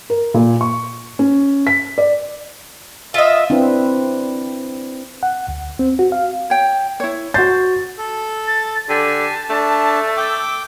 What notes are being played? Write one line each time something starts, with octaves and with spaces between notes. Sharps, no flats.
A#4
A#2
C#6
C#4
B6
D5
F4 D#5 E5
C4 D4 E4 B4
F#5
D2
C4
F#4
F5
C#5 G5
E4 C#5
F#4 C5 A6
A4
A6
D3 G4 G#5 A5
A3 D4
G5 D6 E6